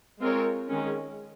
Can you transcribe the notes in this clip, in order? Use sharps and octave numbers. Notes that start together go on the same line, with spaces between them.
G#3 C4 F4 A#4 C#5
D#3 G#3 C#4